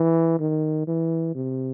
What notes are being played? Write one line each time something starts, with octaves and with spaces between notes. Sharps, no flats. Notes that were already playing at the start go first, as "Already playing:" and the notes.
Already playing: E3
D#3
E3
C3